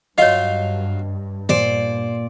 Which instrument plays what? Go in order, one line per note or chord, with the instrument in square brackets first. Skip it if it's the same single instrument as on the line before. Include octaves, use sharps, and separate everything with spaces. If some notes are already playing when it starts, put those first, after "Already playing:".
[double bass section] G2 [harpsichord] F#3 F4 F5 [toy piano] C#5 D#5
[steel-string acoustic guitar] A#2 D5 [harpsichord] C5